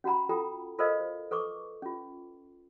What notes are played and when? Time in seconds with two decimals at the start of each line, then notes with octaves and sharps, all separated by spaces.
0.04 C#4 F#4 F#5 A#5 B5
0.29 F4 A4 G5 A#5
0.78 F4 A4 A#4 C5 D#5 F5
1.00 C5
1.31 A4 B4 C#6 D6
1.82 C#4 F4